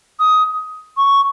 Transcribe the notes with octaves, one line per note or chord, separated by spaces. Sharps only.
D#6
C#6